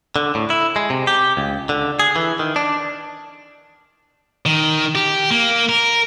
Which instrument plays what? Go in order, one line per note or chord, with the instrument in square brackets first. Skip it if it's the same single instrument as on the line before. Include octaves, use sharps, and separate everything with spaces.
[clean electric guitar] D3
A2
E4
G#3
C3
G4
C#2
D3
G#4
E3
D#3
D4
[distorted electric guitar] D#3
G4
A#3
A#4